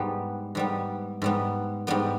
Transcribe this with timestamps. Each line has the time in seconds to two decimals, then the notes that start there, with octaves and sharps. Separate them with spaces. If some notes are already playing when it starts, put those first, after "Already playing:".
Already playing: G#2 G3 B3
0.55 G#2 G3 B3
1.22 G#2 G3 B3
1.87 G#2 G3 B3